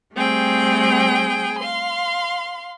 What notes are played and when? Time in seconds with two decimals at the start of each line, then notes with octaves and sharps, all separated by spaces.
0.15 G3 A3 C4 G#4 G5
1.58 F5 C6